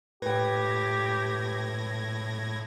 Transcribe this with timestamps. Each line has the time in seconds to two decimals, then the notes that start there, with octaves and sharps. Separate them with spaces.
0.22 A2 G4 B4 G5 G#6 A#6